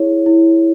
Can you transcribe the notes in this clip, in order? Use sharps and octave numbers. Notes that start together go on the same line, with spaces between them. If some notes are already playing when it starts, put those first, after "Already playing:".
Already playing: E4 G#4 C#5
E4